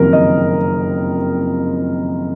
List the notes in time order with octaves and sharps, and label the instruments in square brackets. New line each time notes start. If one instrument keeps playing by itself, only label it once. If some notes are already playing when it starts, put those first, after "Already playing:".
Already playing: [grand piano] F#1 F2 C3 D#3 A#4
D#5